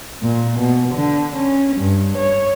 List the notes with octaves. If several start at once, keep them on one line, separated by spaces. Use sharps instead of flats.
A#2
B2
D3
C#4
G2
C#5